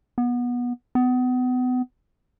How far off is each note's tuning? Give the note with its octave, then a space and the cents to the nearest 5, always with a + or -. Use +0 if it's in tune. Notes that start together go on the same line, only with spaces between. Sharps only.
B3 -20
B3 +30